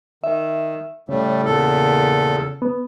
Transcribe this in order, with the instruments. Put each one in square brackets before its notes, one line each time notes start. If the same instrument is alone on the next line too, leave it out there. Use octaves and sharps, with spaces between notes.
[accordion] D#3 [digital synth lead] E5
[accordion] A2 G3 A3 [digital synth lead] C#3
[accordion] E2 A#2 A4
[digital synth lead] B3